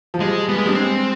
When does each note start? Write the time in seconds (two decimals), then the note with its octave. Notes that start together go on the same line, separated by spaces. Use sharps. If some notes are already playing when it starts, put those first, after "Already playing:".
0.14 F3
0.20 G3 G#3
0.48 G3 B3
0.57 G#3
0.66 G3 D4
0.75 G#3 C4